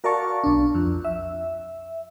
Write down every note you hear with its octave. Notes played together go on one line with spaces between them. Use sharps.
F#4 A#4 D5 F5 A5 C#6
B1 D4
F2
E5